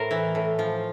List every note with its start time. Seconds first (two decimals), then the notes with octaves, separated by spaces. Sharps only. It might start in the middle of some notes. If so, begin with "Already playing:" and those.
Already playing: A2 A#4 C5
0.11 E3
0.35 A2
0.59 F3